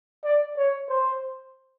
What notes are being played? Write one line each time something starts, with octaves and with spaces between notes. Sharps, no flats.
D5
C#5
C5